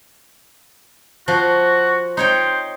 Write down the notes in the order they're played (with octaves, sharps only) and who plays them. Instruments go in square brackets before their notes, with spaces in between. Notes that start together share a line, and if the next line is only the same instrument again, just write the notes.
[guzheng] F3 [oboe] F#4
[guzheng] D#4 C#5 G5 [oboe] C5